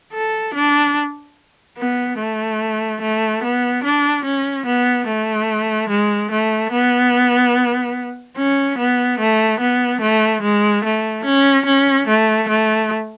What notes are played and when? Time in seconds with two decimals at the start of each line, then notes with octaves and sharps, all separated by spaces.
0.13 A4
0.54 D4
1.78 B3
2.18 A3
3.01 A3
3.43 B3
3.84 D4
4.25 C#4
4.66 B3
5.07 A3
5.89 G#3
6.31 A3
6.72 B3
8.37 C#4
8.78 B3
9.19 A3
9.60 B3
10.01 A3
10.42 G#3
10.84 A3
11.25 C#4
11.66 C#4
12.07 A3
12.48 A3